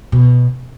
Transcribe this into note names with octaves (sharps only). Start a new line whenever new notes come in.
B2